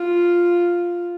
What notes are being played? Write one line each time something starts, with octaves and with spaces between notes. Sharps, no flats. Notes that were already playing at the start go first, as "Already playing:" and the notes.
Already playing: F4